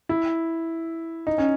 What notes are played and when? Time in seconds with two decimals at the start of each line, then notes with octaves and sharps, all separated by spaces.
0.09 E4
1.27 D#4
1.38 C#4